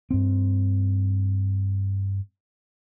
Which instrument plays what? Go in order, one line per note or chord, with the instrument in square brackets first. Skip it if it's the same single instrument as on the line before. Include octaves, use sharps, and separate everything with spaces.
[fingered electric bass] G2 C4